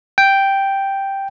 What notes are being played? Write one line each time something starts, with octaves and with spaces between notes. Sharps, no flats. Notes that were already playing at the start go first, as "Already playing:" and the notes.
G5